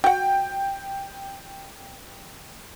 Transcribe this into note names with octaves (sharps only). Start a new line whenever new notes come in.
F#4 F#5 G5